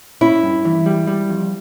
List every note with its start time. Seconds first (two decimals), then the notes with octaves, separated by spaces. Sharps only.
0.21 C#4 E4
0.43 G2
0.65 E3
0.86 G3
1.07 G3
1.29 F2